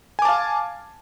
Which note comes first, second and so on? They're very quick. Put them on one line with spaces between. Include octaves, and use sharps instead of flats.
G#5 D6 A5 F5